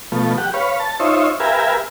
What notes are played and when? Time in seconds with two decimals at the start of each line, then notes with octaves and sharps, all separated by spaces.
0.12 B2 F3 A3
0.38 G4 F#5
0.54 B4 C#5 F5
0.80 A5
1.00 D#4 F4 C5 C#5 E5
1.40 G4 A#4 B4 E5 F5 G#5